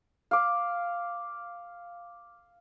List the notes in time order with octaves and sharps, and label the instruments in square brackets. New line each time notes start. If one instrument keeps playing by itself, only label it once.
[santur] F5 D6